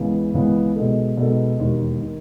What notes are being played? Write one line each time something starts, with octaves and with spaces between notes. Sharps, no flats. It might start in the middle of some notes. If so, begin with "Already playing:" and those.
Already playing: C#2 C#3 E3 B3
C#2 C#3 E3 B3
B2 G#3 D#4 A4
B2 G#3 D#4 A4
E1 D#2 D#3
D#3